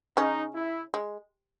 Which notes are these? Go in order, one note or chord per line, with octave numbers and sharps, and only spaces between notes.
C#3 C#4 D#4
E4
G#3